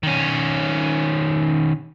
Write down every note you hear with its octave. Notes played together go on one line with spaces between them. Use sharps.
D#3 C#4